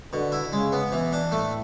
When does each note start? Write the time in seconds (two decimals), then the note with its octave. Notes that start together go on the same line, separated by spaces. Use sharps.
0.13 B2 D3
0.32 E4
0.53 C#3 G#3
0.72 B3
0.92 B2 E3
1.13 D4
1.32 A2 A3